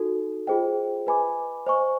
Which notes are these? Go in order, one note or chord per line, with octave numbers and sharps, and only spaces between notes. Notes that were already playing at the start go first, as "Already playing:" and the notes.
Already playing: D#4 F#4 A4
F4 G#4 C5 D#5 G5
B4 D#5 G#5 B5 D6
C5 D#5 G#5 C#6